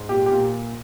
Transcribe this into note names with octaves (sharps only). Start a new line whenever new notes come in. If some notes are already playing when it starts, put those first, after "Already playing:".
Already playing: G#2
A#2 G4
G4
A#2